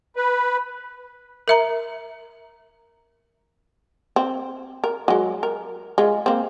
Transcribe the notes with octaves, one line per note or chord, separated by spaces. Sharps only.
B4
A#4 E5 A#5
C4
A#4
F#3 G#3
A#4
G#3 F4
A#3 C4